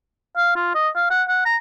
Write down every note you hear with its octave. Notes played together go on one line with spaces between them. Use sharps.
F5
F4
D#5
F5
F#5
F#5
A#5